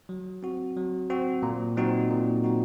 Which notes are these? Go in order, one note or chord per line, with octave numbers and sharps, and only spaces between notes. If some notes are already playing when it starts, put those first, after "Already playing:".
F#3
C4 F#4
F#3
C4 F#4
A#2
F#3 C4 D#4 F#4
A#2
F#3 C4 D#4 F#4